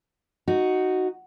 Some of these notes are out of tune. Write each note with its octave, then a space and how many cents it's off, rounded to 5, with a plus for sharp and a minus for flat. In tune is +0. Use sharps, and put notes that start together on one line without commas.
D#4 +0 F#4 +0